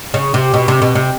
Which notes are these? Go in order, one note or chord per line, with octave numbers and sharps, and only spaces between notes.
C#3
C3
B2
C3
B2
C3